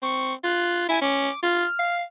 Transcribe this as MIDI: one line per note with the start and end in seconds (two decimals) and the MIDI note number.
0.02 0.34 60
0.02 0.33 85
0.44 0.84 65
0.44 0.84 90
0.89 1.01 64
0.89 0.98 80
1.02 1.30 61
1.02 1.39 86
1.43 1.65 65
1.43 1.94 89
1.79 2.03 77